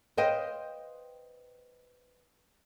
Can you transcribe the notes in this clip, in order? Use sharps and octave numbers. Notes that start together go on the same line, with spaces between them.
B4 C5 D#5 F5 G5